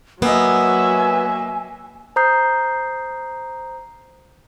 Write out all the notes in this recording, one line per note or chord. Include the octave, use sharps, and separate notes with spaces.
F#3 A#3 B3 D#5 E5 G#5
C5 A#5 D#6 G6 C7